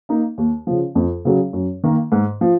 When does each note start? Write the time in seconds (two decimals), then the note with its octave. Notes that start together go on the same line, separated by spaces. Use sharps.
0.09 A#3 D#4
0.38 D#2
0.67 C#3 F3
0.95 F2
1.25 C#3 F#3 C#4 G#4
1.53 F#2
1.83 D#3 A#3
2.12 G#2
2.41 F3